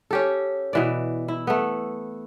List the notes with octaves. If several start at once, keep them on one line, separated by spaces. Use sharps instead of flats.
C#4 G4 A4
B2 E3 D5
E4
A3 B3